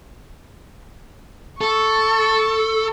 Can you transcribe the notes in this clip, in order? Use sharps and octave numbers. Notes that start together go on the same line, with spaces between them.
A4 C#6